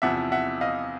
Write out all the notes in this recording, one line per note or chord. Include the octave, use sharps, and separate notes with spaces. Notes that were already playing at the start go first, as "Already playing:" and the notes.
E2 C3 F3 E5 F#5
E5 F#5
D#5 F5